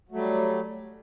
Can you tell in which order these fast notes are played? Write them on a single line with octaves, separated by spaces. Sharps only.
F#3 A3 G3